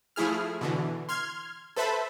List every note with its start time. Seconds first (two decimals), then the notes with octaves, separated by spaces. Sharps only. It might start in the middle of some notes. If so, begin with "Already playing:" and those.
0.16 F3 A3 E4 G#4 F6
0.61 B2 D3 E3
1.09 C6 F6 G#6
1.76 A4 B4 C5 E5 A5 B5